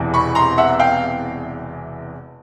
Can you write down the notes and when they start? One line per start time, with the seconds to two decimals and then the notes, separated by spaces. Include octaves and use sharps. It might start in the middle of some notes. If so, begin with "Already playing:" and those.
Already playing: E1 E2 C3 E3
0.14 B5 C#6
0.35 A#5 C6
0.58 E5 F#5
0.79 F5 G5